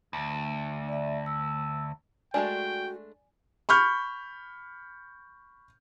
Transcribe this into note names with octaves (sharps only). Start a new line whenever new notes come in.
D2
D5 E5
E6
G#3 A3 D4 F#4 D5 G5 G#5
B5 C#6 F6 G6